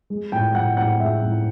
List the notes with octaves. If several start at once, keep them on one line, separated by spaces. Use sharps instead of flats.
G#3
A2 G5
A2 F#5
A2 F#5
G#3 E5
A2